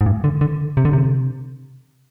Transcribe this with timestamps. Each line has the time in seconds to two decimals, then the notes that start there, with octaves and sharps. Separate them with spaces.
0.01 G#2
0.06 G2
0.24 D3
0.41 D3
0.77 C3
0.85 D3
0.93 C3